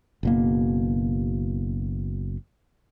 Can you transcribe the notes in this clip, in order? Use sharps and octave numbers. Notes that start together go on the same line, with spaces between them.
F#1 B2 A#3